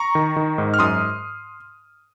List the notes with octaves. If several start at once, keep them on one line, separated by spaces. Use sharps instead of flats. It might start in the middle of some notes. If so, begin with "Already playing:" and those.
Already playing: A#5 C#6
D#3
D#3
G#2
F6
F#2 C6 D#6